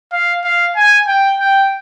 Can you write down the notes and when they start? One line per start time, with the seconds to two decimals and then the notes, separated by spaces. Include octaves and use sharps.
0.12 F5
0.44 F5
0.76 G#5
1.07 G5
1.40 G5